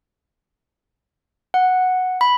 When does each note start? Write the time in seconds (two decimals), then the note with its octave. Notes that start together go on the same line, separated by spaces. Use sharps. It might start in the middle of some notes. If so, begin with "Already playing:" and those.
1.54 F#5
2.21 B5